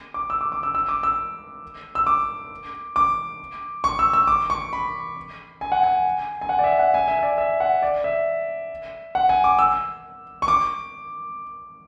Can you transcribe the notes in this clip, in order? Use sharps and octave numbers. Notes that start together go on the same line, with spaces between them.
D6
E6
D6
D6
E6
E6
D6
E6
E6
D6
D6
C#6
E6
E6
D6
C#6
B5
G#5
F#5
G#5
G#5
F#5
D5
E5
F#5
G#5
E5
E5
D5
E5
F#5
D5
E5
F#5
G#5
D6
E6
C#6
D6